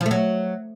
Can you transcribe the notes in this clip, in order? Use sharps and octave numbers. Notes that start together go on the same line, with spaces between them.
F3
A3
F#3